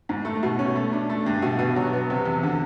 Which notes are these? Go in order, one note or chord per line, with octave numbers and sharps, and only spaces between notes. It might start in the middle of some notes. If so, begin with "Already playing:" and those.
G#2
A3
B2
C#4
A3
D4
A3
G2
B2
B2
F#3
B3
C3
E2
D3